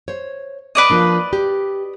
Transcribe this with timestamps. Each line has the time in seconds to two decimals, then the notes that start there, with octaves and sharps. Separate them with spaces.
0.08 C5 C#5
0.75 B4 D5 D#5
0.90 F3 A#3 D4
1.33 G4